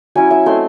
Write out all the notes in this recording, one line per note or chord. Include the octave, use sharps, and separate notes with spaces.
F#3 C#4 E4 G#5
E5
A3 C4 D#4 C6